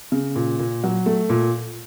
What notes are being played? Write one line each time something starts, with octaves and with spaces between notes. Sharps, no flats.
C#3
A#2
A#2
F#3
A3
A#2